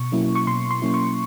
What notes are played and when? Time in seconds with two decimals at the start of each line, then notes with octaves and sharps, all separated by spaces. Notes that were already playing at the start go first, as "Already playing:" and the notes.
Already playing: B2 C#6
0.12 F#3 A#3 C#4 E4
0.35 C#6
0.47 B2 C6
0.71 C6
0.82 F#3 A#3 C#4 E4
0.94 C#6